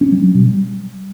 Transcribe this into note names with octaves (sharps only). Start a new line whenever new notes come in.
C#4
G3
F#3
B2
G3